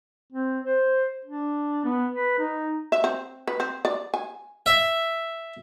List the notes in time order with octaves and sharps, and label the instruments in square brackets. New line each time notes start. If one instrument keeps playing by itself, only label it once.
[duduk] C4
C5
D4
B3
B4
D#4
[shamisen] E5
C4
B4
C4
D5
G#5
[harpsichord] E5